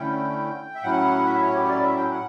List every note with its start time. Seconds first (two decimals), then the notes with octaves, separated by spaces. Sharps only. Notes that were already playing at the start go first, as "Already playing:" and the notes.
Already playing: D3 A3 C#4 E4 G5
0.75 E5
0.83 A2 F#3 C#4 E4 F#5
1.26 E5
1.41 C#5
1.55 G4
1.64 C#5
1.69 D5
1.83 E5
1.97 G5
2.11 F#5